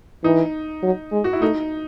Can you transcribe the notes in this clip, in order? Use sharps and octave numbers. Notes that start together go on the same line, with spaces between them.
E3 D#4
F#3
G#3
F#4
E4
A3 D#4